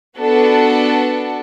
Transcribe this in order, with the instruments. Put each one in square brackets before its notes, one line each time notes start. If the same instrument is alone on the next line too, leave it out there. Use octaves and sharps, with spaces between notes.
[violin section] B3 D4 F#4 A4